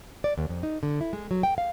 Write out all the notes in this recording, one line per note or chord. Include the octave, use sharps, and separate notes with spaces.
D5
D#2
F2
D#4
D3
E4
G#3
F#3
G5
F5